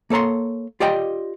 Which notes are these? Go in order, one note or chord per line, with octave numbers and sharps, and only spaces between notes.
A#3 A4 C#5 A#5 C6
F4 G4 D5 D#5 G5